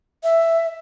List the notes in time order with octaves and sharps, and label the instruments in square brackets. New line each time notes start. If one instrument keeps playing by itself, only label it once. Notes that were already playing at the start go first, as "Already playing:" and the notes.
[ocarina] E5